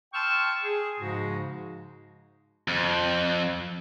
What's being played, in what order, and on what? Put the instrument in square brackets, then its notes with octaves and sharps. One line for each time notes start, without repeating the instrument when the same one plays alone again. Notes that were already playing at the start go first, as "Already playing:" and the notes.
[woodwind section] G5 A5 C6 C#6 E6 F6
G#4
G#2 C#3 F3 G#3 D#4 F#4
[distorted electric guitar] F2